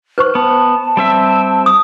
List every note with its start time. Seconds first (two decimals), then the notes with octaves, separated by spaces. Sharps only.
0.18 B4 C5 C#6
0.35 B3 A5
0.97 G3 C4 E5
1.66 D#6